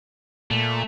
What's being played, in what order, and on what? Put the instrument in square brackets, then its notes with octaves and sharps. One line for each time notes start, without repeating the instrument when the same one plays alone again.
[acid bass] A#2 [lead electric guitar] A3